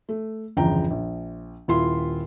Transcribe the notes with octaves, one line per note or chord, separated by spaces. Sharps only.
A3
G1 E2 C#3 F3 G5 A#5
A#1
D#1 E4 F4 C6